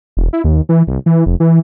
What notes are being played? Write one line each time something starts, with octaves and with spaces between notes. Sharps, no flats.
E1
E4
D#2
E3
C2
E3
F1
E3